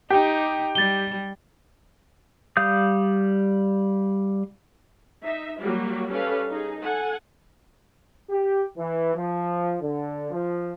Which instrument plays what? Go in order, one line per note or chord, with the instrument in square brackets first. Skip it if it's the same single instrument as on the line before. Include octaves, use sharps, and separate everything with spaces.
[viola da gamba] D#4 [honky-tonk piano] G4
[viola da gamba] G3 [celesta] A6 G7
[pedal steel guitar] G3 F5 D#6 G6
[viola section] D#4 E5
F#3 G3 A#3 F#4 G4
G3 C#4 G4 A4 B4 F5
D#4 G#4
A4 F#5 G#5
[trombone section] G4
E3
F3
D3
F3